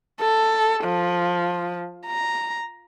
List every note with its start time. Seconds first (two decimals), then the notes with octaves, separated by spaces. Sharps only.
0.21 A4
0.85 F3
2.06 A#5